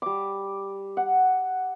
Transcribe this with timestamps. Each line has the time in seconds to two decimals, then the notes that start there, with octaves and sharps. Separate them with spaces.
0.02 G3 D6
0.97 F#5